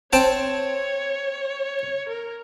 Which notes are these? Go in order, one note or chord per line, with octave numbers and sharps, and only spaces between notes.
C4 C#5 G5 A5
A#4